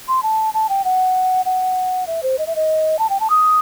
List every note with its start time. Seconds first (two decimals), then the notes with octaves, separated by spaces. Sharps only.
0.08 C6
0.23 A5
0.54 A5
0.69 G5
0.85 F#5
1.45 F#5
2.07 E5
2.23 C5
2.39 D#5
2.47 E5
2.56 D#5
2.99 A5
3.10 G5
3.20 A5
3.30 D#6